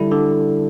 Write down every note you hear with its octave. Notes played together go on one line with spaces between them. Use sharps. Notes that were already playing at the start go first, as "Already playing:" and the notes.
Already playing: D3 G3 E4 A4
D3